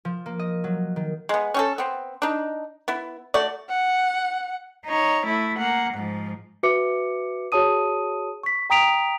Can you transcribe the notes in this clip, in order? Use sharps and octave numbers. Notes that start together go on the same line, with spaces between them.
F3
A#3
D#5
F#3
D#3
G#3 B3
C#4 G4 A4
B3 C4
D4 D#4
B3 E4
A3 F#4 D5
F#5
D#4 C#5
A3 E4
A#3 F#5
G#2 F3
F#4 B4 E5 D6 C#7
F#4 G#4 C#5 A5 D#6 D#7
C#6 B6
G5 A#5 D#6 B6 D7 F7